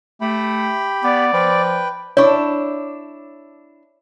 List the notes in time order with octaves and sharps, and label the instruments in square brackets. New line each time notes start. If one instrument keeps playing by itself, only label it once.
[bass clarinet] A3 [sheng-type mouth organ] G4 G5 B5
[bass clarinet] B3 [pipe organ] D5
[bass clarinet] F3 [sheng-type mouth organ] B4 G5
[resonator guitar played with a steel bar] D4 E4 [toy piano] C#5 C#6